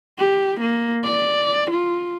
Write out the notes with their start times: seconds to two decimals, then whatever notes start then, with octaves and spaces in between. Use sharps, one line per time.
0.18 G4
0.60 A#3
1.04 D5
1.71 F4